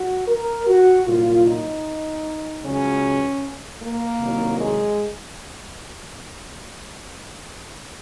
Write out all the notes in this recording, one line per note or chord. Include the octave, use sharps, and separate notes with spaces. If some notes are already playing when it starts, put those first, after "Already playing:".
Already playing: F#4
A#4
F#4
C2 A#2 F#3 F4
D#4
C#2 C#3 F#3 C#4
A#3
C2 C3 D#3 F#3
G#3